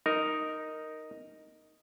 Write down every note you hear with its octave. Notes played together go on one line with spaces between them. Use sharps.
D#4 A#4